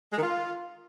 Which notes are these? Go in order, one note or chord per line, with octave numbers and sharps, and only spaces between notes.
G#3
D#3
F4